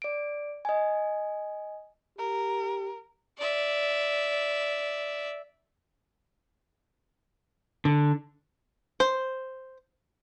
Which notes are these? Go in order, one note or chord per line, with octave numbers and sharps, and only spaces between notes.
D5 D7
D#5 G#5
G4 A#4
D5 E5
D3
C5